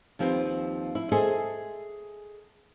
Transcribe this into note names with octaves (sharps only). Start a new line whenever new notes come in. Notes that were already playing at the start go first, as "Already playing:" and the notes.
D#2 F3 C4 G4 B4
E4
G#4 A4 C5 D#5 E5 G#5